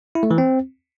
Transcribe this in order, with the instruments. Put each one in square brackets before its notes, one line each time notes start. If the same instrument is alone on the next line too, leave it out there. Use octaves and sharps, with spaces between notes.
[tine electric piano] E4
A3
E3
C4